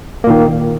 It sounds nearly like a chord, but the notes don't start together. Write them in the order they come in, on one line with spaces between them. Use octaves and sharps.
A#3 A#2 D#3